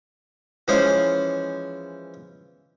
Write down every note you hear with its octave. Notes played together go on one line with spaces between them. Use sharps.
E3 F3 G#3 C#4 C5